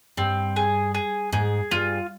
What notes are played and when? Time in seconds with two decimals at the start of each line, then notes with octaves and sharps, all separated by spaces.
0.17 G2 C4
0.56 G#4
0.94 G#4
1.32 G#2 G#4
1.71 G2 F4